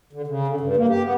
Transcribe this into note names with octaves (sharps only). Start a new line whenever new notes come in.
D3
C#3
D3
G2
A#3
G4
B3